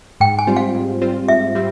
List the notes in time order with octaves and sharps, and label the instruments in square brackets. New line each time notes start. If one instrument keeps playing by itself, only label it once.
[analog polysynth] G#2 [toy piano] G5
[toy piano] G#5
[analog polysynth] G3 C4 F4 C5
[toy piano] F5
[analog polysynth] G#2
G3 C4 F4 C5
[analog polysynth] G#2 [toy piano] E5
[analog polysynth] G3 C4